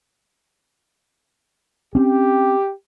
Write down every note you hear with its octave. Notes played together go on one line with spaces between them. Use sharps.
C4 C#4 G4